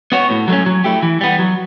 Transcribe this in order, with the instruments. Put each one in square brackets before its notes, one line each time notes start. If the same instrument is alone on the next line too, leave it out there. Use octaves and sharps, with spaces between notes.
[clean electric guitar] B3 F#4 C#5
A2
F#3 A3 C#4
F#3
A3 E4 G4
E3
G3 B3
F#3